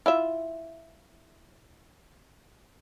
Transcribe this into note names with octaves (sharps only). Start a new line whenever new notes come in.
E4 F4 E5